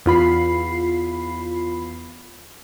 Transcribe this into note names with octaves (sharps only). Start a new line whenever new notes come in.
E2 F4 B5 C7